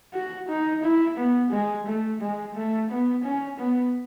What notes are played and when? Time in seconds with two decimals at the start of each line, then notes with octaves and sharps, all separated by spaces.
0.13 F#4
0.49 D#4
0.83 E4
1.17 B3
1.51 G#3
1.86 A3
2.21 G#3
2.55 A3
2.90 B3
3.24 C#4
3.59 B3